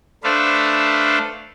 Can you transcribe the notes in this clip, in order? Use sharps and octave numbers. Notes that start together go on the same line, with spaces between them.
A3 D4 A4 B4 C5 F5